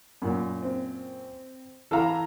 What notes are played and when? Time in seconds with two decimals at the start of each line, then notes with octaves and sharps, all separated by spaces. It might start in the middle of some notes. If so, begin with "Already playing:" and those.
0.22 F#2 A#2
0.62 C4
1.91 E3 A4 F5 A#5 B5